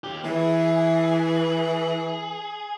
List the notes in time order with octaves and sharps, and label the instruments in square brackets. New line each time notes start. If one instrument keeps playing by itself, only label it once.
[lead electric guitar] D#2 G4
[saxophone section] E3 [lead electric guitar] G#4